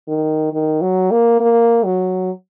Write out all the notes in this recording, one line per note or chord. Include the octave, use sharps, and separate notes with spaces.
D#3
D#3
F#3
A#3
A#3
F#3